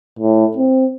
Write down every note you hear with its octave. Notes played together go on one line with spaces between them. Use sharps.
A2
C4